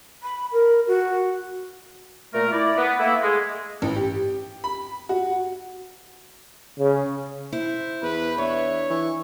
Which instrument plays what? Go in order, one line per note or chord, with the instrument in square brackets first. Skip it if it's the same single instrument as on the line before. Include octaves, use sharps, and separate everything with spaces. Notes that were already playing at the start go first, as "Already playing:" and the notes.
[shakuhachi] B5
A#4
F#4
[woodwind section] A#2 A3 A#4
E4 D5
B3
A3 A#3 E4
G#3
[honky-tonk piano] A1
G4
B5
F#4
[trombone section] C#3
[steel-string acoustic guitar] E4 [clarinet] C5
[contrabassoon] E2 [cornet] B4
[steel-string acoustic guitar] D4 [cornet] C#5 [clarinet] E5
[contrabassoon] E3 [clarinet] C#6